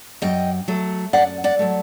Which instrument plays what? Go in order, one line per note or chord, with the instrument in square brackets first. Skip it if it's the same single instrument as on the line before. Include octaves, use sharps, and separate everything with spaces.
[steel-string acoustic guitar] F#2 D#5 G5
F#3 A3
F#2 D5 F#5
D5 F#5
F#3 A3